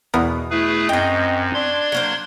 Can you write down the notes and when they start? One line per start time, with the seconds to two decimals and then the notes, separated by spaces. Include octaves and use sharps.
0.14 E2 B2 B3 A#4
0.51 A3 E4 G#4 B4
0.89 F#2 C4 D#5 G5
1.54 D4 D5 C6 G#6
1.92 F#3 A#3 C5